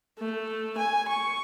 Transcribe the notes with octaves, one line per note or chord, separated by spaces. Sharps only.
A3
G#5
C#6